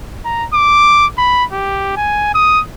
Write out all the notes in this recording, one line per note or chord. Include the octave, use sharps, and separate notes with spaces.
A#5
D6
B5
G4
G#5
D#6